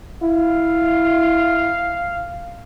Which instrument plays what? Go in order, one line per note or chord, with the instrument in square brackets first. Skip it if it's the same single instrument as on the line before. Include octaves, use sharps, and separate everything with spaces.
[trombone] E4 [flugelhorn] F5